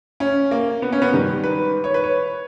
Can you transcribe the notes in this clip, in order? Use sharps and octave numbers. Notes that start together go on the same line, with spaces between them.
C#4
A#3
B3
C#4
B3
G#2 D#3 G3
B4
C#5
B4
C#5